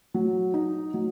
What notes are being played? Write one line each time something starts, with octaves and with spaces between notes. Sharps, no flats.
F#3
D#4
F#3